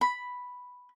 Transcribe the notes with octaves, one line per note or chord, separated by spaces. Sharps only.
B5